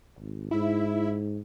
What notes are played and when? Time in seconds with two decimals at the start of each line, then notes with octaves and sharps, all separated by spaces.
0.19 G#1
0.51 G#2 E4 E5